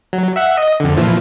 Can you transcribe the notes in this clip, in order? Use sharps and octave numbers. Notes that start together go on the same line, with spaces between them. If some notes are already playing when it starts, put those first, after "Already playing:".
F#3
E5 F#5
D#5
F2 D3
A#2 E3 F3